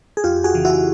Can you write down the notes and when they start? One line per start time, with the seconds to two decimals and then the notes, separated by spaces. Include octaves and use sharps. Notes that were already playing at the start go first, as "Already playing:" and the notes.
0.17 G#4
0.24 F2 F4 G4
0.44 F#4 G#4
0.55 C#3 E3
0.65 E4 F#4